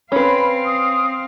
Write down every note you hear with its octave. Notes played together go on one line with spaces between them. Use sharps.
C4 C#4 B4 F5 B5
D#6